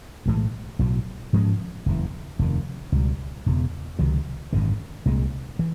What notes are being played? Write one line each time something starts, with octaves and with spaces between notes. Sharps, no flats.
B1 A2 E3 G#3
B1 A2 F#3
G#2 F3 G#3 C#4
F#1 E2 C#3 E3
F1 D#2 D#3
C#2 B2 G3
E1 E2 C#3
C#2 C3 D#3 F#3
G#1 F#2 D3
C2 A#2 F3 G#3
E3